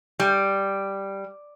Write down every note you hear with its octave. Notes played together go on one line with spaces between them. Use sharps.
G3